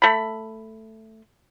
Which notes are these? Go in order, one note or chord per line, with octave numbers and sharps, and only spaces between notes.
A3 B5